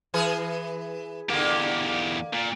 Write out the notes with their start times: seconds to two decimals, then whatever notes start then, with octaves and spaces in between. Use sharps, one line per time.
0.14 E3 G#4 B4
1.30 E2 D3 A#3 G4
2.33 A#2